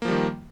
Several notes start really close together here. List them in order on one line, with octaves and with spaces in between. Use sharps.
A#3 F3 G3 D#3